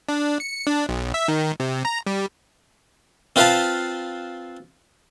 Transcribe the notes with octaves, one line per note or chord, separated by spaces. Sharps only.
D4
C#7
D4
B1
E5
D#3
C3
A#5
G3
C4 F4 B4 C5 F5 A5